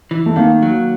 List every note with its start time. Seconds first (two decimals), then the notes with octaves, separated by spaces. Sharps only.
0.11 E3
0.26 A3
0.36 D#3 A#3
0.62 F#3